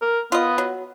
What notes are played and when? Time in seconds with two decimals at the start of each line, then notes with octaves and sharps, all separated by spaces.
0.02 A#4
0.32 B3 F4 D#5
0.58 F#3